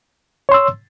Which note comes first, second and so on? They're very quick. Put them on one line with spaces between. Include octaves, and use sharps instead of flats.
C#5 C6 E6